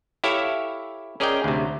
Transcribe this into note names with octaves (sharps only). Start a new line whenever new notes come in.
E4 G4 A4 C#5 E5 F5
C#4 G#4 A#4 D5 D#5 G5
D2 C3